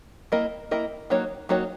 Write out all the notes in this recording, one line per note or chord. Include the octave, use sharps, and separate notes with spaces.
A#3 E4 A#4 D#5
A#3 E4 A#4 D#5
F#3 A#3 D#4 F#4 C#5
F#3 A#3 D#4 F#4 C#5